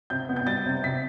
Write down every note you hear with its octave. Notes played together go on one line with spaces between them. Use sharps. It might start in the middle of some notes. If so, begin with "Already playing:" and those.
C3 G6
B3
G6
G3 A6
C3
C3 B6